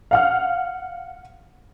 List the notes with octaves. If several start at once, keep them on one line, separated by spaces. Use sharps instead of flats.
F5 F#5 F6